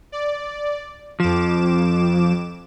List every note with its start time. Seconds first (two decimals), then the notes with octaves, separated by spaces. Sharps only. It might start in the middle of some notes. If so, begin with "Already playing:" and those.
0.12 D5
1.20 F2 F3 D6 E7